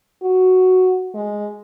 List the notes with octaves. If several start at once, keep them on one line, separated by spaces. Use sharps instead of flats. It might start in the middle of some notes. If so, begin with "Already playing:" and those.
F#4
G#3